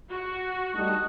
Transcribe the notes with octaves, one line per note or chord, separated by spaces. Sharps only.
F#4
G3 A3 D#4 A5 D#6 F#6